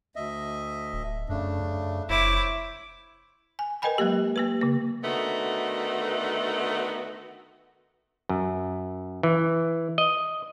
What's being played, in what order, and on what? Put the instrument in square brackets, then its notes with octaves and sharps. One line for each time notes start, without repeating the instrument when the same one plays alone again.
[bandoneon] D2 D#5 E5
[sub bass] D1
[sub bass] F#2 [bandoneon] C#3 A3 D4
[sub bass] F#2
[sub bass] F1 [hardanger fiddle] E4 D6 [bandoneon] C5 C#5 C#6
[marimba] G#5
A#4 B4 D#5 G5 G#5 B5
F#3 G#3 A#3 G4
A#3 G4 B4
C#3 A#3
[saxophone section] D3 D#3 A3 B3 F#4
[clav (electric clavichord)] F#2
E3
D#5